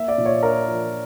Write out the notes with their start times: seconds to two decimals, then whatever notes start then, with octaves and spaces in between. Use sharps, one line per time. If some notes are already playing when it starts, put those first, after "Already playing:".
Already playing: A#3 E5
0.08 D5
0.18 A#2
0.25 C#5
0.43 D4 A#4
0.68 F3